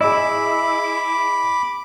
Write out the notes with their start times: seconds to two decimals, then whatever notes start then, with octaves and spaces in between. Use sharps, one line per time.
0.01 E4 G#4 D#5 B5 D6